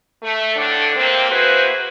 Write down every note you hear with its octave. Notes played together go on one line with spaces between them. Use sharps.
A3
A2 D3 D4
C3 A#3 C4
A#3 E4 F#4 G#4 B4 C5